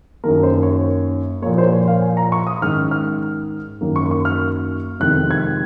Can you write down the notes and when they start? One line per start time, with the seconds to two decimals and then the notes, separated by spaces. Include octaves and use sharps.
0.24 F#2 D#3 A#3 A#4
0.43 C5
0.63 C#5
1.42 A#2 F3 A#3 C#5
1.58 C5
1.72 C#5
1.88 F5
2.02 G#5
2.17 A#5
2.32 C#6
2.47 D#6
2.62 G#2 D#3 G#3 C#4 F6
2.91 F6
3.81 F#2 D#3 F#3 A#3
3.96 C#6
4.11 C#6
4.25 F6
5.00 F2 C3 D#3 G#3 C4 F#6
5.31 G#6